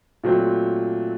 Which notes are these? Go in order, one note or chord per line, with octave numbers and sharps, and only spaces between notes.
A#2 F#3 A3 C4